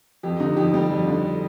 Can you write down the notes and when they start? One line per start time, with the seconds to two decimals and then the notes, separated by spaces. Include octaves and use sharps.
0.23 F2 G4
0.40 D3 D#4
0.56 F2 G4
0.73 G3 G4
0.90 F2
1.07 D3